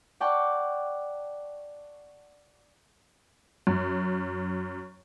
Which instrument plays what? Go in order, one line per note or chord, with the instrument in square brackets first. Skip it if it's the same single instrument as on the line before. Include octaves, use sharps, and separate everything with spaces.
[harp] D5 F#5 G5 A5 C#6
[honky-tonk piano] F#2